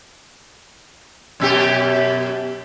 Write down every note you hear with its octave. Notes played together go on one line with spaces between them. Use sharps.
F#2 B2 G4